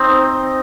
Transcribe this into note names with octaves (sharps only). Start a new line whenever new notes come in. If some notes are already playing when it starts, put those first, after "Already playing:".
Already playing: C4 D#4